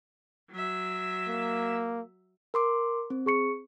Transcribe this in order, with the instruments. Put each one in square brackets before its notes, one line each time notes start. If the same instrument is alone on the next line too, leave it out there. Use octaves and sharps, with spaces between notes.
[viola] F#3 E5
[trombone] A#3
[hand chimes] A#4 C6 D6
C4
[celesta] G#4 C#6 C#7